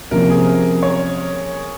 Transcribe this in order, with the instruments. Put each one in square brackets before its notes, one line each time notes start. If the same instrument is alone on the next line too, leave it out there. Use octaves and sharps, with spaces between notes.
[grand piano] C3 F3 A#3 C#4 [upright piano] A#4
[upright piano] G#4
A#4
C#5